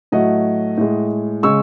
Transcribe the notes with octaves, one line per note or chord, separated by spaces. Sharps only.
A2 F#3 A3 D#5 F#5
A2 G#3
C#3 G#3 C#6 E6